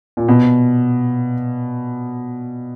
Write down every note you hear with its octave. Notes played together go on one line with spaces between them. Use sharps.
A#2
B2